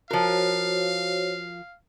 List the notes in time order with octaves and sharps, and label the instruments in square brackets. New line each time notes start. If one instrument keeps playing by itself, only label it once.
[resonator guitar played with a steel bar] F3 A#4 [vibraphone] F#4 C5 C#5 [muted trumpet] F5